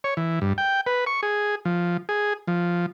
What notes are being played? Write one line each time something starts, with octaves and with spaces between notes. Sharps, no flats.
C#5
E3
G2
G5
B4
C#6
G#4
F3
G#4
F3